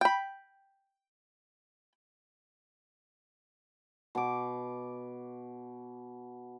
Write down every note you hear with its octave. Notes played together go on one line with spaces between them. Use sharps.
G5 B5
B2 D6